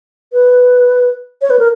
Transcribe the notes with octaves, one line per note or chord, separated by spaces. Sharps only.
B4
C#5
B4
A#4